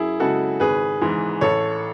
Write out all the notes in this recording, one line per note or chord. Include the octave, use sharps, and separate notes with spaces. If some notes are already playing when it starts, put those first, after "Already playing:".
Already playing: F#2 E4 G#4
C#3 G#3 F#4 A4
G#1 G#4 B4
G#2 E3
A1 A4 C#5